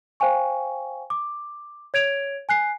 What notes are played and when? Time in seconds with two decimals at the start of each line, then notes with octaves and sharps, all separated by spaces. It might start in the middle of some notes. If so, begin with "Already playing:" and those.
0.20 C5 F5 G5 G#5 C#6
1.10 D6
1.94 C#5 G#6 D7 F7
2.49 G#5 F#6 C7